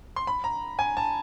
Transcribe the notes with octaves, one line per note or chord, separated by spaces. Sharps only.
C6
B5
A#5
G#5
A5